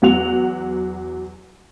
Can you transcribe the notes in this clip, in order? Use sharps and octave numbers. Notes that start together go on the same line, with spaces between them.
E2 F#3 F#5 F7